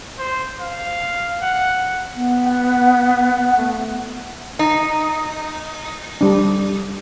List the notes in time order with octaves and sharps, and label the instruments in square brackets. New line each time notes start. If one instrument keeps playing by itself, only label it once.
[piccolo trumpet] C5
F5
F#5
[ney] B3
[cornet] F#5
A3
[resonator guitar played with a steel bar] D#4
[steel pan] G3 D4